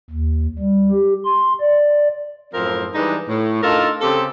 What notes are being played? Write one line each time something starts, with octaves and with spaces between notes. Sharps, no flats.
D#2
G3
G4
C6
D5
F#2 A2 F3 C4 A#4
E3 G3 G#3 D4 D#4
A2
D4 D#4 F4 A4 A#4
C#3 C4 G4 A4